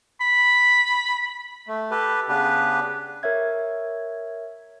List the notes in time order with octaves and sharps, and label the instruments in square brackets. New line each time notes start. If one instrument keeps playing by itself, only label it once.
[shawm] B5
[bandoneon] A3
G4 A4 B4
C#3 B3 D4 G4 B4
[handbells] A#4 C#5 E5 G#6